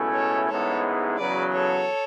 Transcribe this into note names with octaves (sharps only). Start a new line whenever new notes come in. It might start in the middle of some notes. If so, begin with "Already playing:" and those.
Already playing: C#2 B2 A3 C#4 E4
A4 C#5
A1 G#2 G#3 B3 E4 A4 C#5
E2 C#3 F#3 B4 D5
A4 C#5